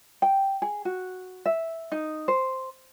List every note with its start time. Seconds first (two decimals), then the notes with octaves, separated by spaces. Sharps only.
0.22 G5
0.62 G#4
0.85 F#4
1.46 E5
1.92 D#4
2.28 C5